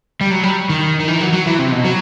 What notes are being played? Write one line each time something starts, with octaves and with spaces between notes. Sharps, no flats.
G3
F#3
G3
D#3
D#3
E3
F#3
F#3
E3
C3
B2
F#3